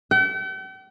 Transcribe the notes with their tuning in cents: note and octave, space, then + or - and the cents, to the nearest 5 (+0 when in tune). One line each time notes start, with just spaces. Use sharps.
G5 -45